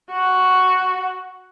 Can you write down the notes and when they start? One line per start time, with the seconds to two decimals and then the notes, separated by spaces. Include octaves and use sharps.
0.11 F#4